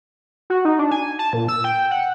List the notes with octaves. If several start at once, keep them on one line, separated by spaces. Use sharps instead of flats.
F#4
D#4
D4
G#5
A5
A#2
E6
G5
F#5